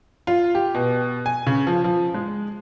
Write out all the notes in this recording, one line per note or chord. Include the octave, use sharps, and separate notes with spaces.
F4
G4
B2
G#5
C#3
F3
F3
G#3